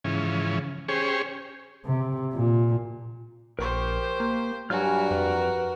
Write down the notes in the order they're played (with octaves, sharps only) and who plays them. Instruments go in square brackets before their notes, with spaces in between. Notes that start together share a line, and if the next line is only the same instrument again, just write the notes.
[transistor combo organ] G#2 C#3 E3 F3 C#4
C#4 G4 G#4 C5 C#5
[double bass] C3
A#2
[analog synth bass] A#1 [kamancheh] G4 C5 [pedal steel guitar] A#4 C#6
[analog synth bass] A#3
[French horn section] G2 G3 [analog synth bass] F#3 [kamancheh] F#4 A#4 [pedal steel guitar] G#5 F6
[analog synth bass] F2 [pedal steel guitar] B4